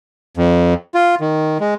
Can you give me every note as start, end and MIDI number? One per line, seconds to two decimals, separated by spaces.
0.37 0.74 41
0.94 1.15 65
1.20 1.58 51
1.60 1.74 56